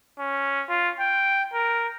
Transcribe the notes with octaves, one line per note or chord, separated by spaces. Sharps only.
C#4
F4
G5
A#4